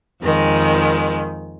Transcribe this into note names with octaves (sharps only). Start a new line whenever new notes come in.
F2 D#3 G#3